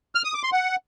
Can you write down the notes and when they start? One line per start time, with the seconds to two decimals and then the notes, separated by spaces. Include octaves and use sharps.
0.15 F6
0.24 D#6
0.34 D6
0.43 C6
0.53 F#5